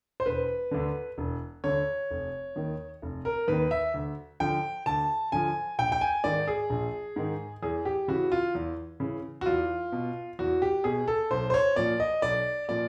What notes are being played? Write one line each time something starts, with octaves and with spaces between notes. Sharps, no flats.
C5
E1 B4
D2 D3
E1
D2 D3 C#5
F1
D#2 D#3
F1
A#4
D#2 D#3 B4
E5
D2
D3 F3 G5
D2 A5
D3 F3 G#5
A#1 G5
G5
G#5
G#2 D#3 D5
G#4
A#1
G#2 D#3
E2 G#4
G4
C#3 E3 F#4
F4
E2
C#3 E3
F#4
E2 F4
B2
E2 F#4
G4
B2 G#4
A4
B1 C5
C5
C#5
A#2 F3 D5
D#5
B1 D5
A#2 F3 D5